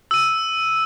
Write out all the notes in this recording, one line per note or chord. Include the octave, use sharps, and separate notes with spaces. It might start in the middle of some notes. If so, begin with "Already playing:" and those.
E6 D#7